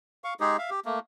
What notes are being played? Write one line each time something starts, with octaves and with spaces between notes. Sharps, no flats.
F5 C#6
G#3 D#4 G4 G#4
E5 F5
G4
A3 A#3